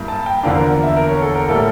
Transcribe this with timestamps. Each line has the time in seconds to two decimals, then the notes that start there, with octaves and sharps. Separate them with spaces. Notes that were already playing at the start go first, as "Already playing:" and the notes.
Already playing: G2 A#3 E4
0.08 A5
0.26 G5
0.43 E2 D3 F3 A#3 D4 F5
0.56 A#4
0.83 E5
0.96 A#4
1.09 C#5
1.22 A4
1.35 A#4
1.48 A2 G3 A#3 E4 A4